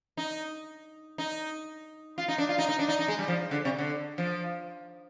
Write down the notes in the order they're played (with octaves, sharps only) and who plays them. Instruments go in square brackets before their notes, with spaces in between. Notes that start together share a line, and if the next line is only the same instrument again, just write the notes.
[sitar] D#4
D#4
F4
D#4
D4
F4
D#4
D#4
D4
D#4
D#4
G#3
G3
F3
D3
C3
D3
F3